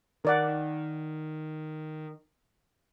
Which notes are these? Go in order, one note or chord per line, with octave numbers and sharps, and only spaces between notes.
D#3 A#4 D5 F#5